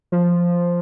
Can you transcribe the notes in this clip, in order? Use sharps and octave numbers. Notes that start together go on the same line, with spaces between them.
F3